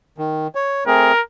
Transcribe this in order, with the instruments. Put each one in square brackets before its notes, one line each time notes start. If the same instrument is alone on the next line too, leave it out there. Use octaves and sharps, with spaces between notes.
[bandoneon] D#3
C#5
[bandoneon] A3 C4 G#4 [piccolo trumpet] A#4